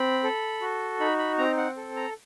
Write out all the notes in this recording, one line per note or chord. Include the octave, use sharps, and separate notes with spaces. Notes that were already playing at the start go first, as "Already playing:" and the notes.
Already playing: C4 B5
A4
F#4
D#4 B5
B5
C4 A#5
F#5
A4
A#5